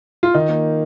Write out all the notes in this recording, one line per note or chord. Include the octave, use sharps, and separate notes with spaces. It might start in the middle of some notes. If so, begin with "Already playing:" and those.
F4
D#3 D#4
A#3